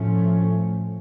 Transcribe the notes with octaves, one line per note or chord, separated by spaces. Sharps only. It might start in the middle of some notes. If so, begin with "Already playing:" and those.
Already playing: A2 F3 A3 C#4